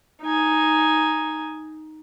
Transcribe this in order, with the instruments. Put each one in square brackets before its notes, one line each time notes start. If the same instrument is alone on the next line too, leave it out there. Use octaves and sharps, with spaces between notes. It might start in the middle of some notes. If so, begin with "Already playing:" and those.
[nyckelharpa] D#4 G#5